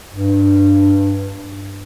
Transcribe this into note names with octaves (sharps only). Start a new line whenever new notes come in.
G2